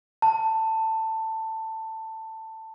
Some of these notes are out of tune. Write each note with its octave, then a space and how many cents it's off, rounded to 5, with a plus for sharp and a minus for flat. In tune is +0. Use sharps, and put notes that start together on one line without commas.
A5 +15